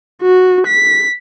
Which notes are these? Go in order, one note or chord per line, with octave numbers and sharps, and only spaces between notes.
F#4
B6